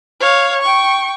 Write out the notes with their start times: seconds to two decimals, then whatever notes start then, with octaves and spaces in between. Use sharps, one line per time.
0.20 C#5 F5
0.62 G5 C#6